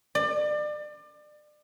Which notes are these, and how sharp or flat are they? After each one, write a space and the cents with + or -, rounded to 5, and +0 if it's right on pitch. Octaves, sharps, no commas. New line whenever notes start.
D5 +30